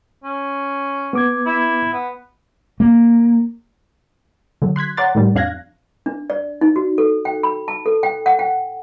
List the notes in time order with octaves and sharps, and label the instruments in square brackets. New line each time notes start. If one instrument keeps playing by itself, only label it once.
[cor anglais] C#4
[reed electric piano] B3 D6 G#6
[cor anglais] E4
B3
[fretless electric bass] A#3
[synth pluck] D3 F#3
C6 F#6 G#6 B6
C#5 D5 F#5 A#5 C6 A6
A2 D#3 G3
F2 D4 F5 F#6 G#6 A#6
[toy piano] D4
D5
D#4
F#4
A4
G5
B5
A5
A4
G5
F#5
G5